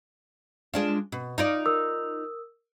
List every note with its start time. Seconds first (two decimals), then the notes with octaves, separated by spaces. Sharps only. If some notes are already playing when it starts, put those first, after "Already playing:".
0.74 G#3 D4 F4
1.12 B2
1.38 D#4 F4 D5
1.66 A#4 D#6 E6